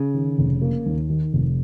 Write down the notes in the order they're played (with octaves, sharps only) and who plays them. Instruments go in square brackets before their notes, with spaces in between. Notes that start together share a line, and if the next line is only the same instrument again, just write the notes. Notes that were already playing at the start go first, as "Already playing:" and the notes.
Already playing: [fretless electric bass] C#3
[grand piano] D#3
F1
A#3
D#2
D#3
F1